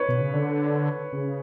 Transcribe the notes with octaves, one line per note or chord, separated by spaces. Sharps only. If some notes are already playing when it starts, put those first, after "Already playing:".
Already playing: B4 C#5
B2
C#3
D3
C#3